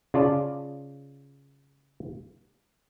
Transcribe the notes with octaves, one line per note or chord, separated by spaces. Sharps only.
C#3 F4 D5 A5